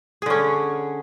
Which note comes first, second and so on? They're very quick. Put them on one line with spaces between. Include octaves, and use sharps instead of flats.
G#4 D3 C#4